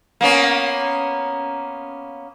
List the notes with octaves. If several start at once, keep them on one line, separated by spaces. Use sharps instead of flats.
A#3 B3 C#4